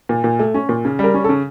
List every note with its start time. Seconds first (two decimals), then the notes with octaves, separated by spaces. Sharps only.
0.09 A#2
0.24 A#2
0.39 A3
0.54 C#4
0.69 A#2
0.85 C#3
0.99 G3
1.04 A#4
1.14 C#4
1.24 A4
1.29 C#3